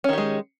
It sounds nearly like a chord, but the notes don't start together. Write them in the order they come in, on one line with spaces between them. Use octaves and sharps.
C#4 D#3 G4 G#3